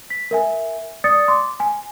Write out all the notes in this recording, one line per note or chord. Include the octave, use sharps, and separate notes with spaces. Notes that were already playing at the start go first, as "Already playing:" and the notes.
B6
A#4 E5 G#5
D5 D#6 A6 C#7
C6 D6
G#5